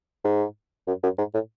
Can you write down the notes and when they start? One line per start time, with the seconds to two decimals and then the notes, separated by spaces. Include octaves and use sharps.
0.25 G#2
0.88 F#2
1.03 F#2
1.18 G#2
1.34 A2